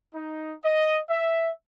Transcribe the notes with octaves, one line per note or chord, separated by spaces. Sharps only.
D#4
D#5
E5